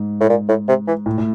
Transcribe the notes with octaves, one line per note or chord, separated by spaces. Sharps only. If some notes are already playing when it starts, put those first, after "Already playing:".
Already playing: G#2
A2
A#2
A2
C3
E3
A2
A2